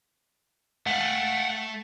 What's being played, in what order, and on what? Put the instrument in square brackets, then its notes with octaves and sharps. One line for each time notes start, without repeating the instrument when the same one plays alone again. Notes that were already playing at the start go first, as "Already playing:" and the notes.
[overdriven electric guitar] A3 [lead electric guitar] F5 F#5